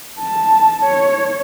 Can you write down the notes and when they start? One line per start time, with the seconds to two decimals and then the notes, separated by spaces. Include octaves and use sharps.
0.19 A5
0.83 C#5